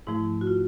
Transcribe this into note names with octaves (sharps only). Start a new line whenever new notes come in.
G#2 F3 A3 E4
F#4
F4